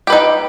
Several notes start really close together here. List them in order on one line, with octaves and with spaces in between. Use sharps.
G4 B4 D#4 G5